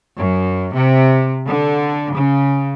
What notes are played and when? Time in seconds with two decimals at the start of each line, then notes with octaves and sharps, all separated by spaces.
0.18 F#2
0.74 C3
1.47 D3
2.14 C#3